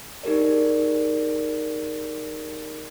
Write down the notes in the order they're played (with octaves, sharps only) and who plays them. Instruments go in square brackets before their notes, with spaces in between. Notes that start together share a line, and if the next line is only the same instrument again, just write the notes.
[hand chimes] D#4 G4 G#4 A#4 D5